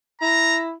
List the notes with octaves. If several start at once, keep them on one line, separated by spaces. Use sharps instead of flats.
E4 A#5